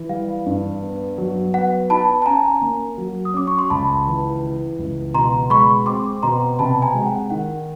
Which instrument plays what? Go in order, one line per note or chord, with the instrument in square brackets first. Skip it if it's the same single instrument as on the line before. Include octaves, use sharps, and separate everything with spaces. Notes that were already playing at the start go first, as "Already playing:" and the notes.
Already playing: [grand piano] E3
[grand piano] G3 [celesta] F5
[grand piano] G2
B3
F#3
[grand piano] B3 [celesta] F#5
[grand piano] D#4 [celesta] A5 B5
[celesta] A5
[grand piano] C#4 [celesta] G#5 A#5
[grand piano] A#3
F#3
[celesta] D#6
[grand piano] C#4 [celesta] D6
[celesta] C#6
C6
[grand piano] C#2 [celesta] A5 B5
[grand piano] E3
E3
C#2
[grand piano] B2 [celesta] A#5 C6
[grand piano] G#3 [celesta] B5 C#6
[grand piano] C4 [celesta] C6 D6
[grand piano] B2 [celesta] A#5 C6
[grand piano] C3 [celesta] A5 B5
[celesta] G#5 A#5
[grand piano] G#3
[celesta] G5
F#5
[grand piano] D#3 [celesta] F#5